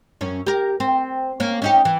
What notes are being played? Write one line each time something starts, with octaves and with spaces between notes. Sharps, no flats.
F#2 C#4
G4 A#4
C4
A#3 C#4
C#4 D#4 G4
E3